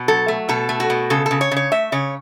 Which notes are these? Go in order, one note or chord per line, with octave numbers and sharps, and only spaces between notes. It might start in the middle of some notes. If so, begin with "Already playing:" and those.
Already playing: B2
F#3 A4
A3
B2 A4
A3
F#4
B2
C#3 A4
A4
C#3
C#5
C#3
C#5
A3 E5
C#3 C#5